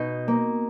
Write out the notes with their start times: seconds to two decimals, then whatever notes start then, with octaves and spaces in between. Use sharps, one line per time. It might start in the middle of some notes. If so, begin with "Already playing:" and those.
Already playing: B2 D#4
0.28 A#3